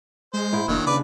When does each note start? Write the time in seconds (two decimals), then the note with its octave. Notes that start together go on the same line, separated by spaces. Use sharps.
0.34 G#3 C5
0.52 G#2 E4
0.68 F1 D#2 D#3 F#3 D4
0.86 C#3 B4 D5